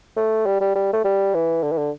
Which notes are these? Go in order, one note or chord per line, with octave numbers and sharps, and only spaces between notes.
A3
G3
G3
G3
A3
G3
E3
D3
E3
D3